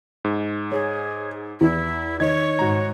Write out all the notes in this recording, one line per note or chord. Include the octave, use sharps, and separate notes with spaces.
G#2
G#4 C#5
E2 E4
D#3 C#5 D#5 G#6
G#2 F#4 A#5